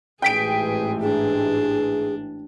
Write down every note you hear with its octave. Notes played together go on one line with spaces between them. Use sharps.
A1 G#2 E3 G#4 G5 B6 D7
D4 G#4